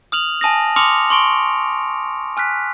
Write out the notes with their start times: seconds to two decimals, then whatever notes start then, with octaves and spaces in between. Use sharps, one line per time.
0.12 D#6 F6 F7 F#7
0.41 G#5 A5 D#6 A#6
0.76 C6 D6 D#6 F6 C#7 F7
1.10 C6 C#6 D7
2.37 G#5 F6 F#6 B6